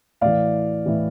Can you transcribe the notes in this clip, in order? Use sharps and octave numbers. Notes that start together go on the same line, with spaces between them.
A2 E3 D5 F5
A2 E3